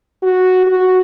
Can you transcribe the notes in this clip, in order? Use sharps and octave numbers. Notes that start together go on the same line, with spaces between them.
F#4
F#4